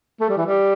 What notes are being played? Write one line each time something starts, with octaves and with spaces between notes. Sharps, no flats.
A3
G3
E3
G3